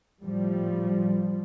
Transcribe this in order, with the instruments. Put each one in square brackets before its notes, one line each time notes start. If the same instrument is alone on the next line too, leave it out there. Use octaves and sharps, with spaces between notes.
[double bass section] A2 F3 G3